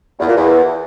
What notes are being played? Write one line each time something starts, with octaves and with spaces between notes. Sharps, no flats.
E2
A#2
E2